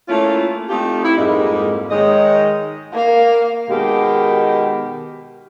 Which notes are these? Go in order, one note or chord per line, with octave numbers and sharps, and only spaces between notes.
A3 A#3 C#4 E4 F4
A3 C4 D#4 F4 G4
E4
F2 G#2 G3 G#3 A#3 D#4
D#3 G#3 D#4 C#5 D#5
A#3 F5
B2 D#3 G#3 G4